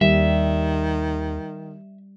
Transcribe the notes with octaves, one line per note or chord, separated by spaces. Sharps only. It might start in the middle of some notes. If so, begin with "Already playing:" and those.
D#2 D#3 G3 E5